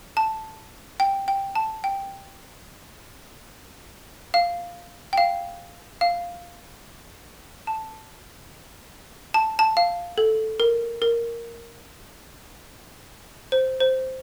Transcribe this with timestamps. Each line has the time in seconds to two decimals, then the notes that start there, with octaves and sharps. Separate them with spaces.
0.17 A5
1.00 G5
1.28 G5
1.55 A5
1.84 G5
4.34 F5
5.13 G5
5.18 F5
6.01 F5
7.67 A5
9.34 A5
9.59 A5
9.77 F5
10.18 A4
10.60 A#4
11.02 A#4
13.52 C5
13.80 C5